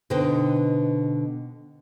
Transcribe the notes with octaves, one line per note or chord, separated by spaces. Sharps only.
B2 D3 D#4 B4 C5 G5